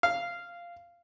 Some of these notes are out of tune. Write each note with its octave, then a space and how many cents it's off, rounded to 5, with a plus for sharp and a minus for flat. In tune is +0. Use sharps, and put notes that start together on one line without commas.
F5 -10